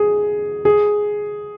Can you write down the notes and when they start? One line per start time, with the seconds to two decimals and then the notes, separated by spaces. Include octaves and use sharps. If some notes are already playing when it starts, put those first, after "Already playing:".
Already playing: G#4
0.65 G#4